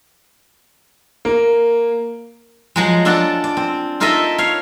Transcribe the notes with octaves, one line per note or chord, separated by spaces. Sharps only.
A#3
F3 F#3 G#3
D4 F4 A4 D5 F#5 A5
D5
C4
D#4 F4 A4 A#4 D#5 E5
C#5 F5